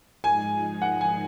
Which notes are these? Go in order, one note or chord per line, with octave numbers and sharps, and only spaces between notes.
G#2 F3 G#3 D#4 G#4 G#5
F#5
G#5